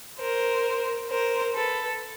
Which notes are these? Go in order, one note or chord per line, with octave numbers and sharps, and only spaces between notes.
A#4 C5
A#4 C5
A4 B4